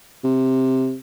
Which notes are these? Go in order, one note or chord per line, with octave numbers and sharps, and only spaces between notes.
C3